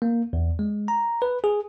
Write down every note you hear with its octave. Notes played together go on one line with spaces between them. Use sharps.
A#3
E2
G#3
A#5
B4
G#4